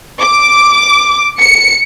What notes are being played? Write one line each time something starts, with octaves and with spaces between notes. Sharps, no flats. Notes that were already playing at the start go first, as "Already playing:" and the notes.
D6
C#7